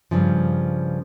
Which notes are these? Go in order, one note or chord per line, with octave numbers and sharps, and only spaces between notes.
G2 C#3 F3